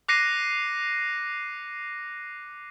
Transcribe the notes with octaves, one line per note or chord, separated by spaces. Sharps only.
D6 F#6 A#6 C7 C#7 D#7